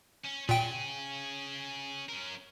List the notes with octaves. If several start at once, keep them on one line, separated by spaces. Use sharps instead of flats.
C#4
A#2 C#4 G#4 G5
C#4 A#4